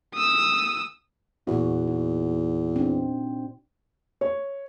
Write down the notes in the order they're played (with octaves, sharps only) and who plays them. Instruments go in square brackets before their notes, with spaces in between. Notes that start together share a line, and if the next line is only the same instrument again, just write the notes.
[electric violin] D#6 E6
[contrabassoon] E2 [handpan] A#2 F#4
[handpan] D#4
C4 D4 D#4
[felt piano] C#5